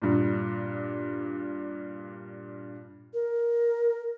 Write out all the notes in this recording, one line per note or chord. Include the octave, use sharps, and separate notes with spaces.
G2 A#2
A#4